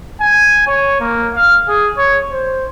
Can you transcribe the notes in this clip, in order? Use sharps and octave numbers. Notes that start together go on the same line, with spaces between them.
G#5
C#5
A#3
F5
G#4
C#5
C5